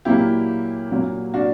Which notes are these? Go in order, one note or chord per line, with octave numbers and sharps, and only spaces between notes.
A#2 F#3 A#3 E4 G4
A#2 F#3 A#3
D4 F#4